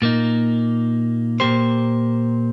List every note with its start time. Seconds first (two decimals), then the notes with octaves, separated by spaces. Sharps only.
0.02 A#2 A#3 D#4
1.40 A#2 A#3 G4 C5